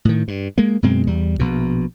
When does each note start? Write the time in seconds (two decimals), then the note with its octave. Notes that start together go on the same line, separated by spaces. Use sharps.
0.05 A2 D#3
0.28 G2
0.58 G#3 A#3
0.83 F#2 B2 G#3 C4
1.07 E2 G3
1.39 A#1 B2